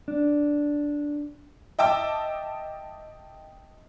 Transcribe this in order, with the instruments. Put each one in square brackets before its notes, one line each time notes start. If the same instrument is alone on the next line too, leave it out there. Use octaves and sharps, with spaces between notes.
[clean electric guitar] D4
[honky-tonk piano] D#5 E5 G5 A5 D6 E6